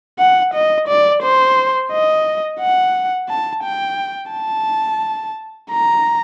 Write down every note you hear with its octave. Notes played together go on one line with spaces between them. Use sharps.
F#5
D#5
D5
C5
D#5
F#5
A5
G5
A5
A#5